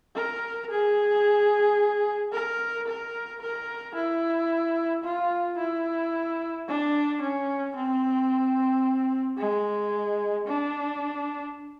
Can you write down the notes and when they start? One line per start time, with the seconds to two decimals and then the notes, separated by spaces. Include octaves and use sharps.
0.16 A#4
0.70 G#4
2.32 A#4
2.87 A#4
3.42 A#4
3.95 E4
5.04 F4
5.58 E4
6.68 D4
7.22 C#4
7.76 C4
9.38 G#3
10.47 D4